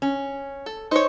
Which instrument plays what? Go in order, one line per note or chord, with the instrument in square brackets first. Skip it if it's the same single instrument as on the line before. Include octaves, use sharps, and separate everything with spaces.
[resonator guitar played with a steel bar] C#4
[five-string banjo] A4
[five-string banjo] D#4 C#5 [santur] C5